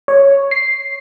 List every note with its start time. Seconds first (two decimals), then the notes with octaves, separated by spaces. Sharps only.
0.08 C#5
0.51 C7